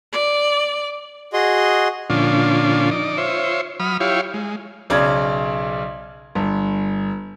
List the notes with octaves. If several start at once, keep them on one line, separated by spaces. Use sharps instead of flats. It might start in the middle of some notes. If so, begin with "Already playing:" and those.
D5
F#4 G#4 D#5 C6
A#2 D3 F3 C#4 D4 F4
D#4 D5
F4 C5 C#5 E5
F#3 B5 D#6 F6
E4 F4 G4 C#5 F5
G#3
B1 C#3 D5 G#6
G1